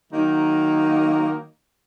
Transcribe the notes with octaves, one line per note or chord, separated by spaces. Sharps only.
D#3 F#3 A#3 D#4